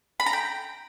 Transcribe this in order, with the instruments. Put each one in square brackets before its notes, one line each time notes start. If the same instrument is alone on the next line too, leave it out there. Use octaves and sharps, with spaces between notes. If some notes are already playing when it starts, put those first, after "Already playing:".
[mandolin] B5
A#5
G5